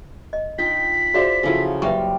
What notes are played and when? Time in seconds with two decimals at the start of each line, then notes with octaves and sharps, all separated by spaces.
0.33 D#5
0.58 D4 D#4 F4 G5 B6
1.14 F#4 G#4 C5 D5 E5 F5
1.43 C#3 F3 F#3 E4 A4
1.82 F#1 G3 B4 E5 F5 C6 C#6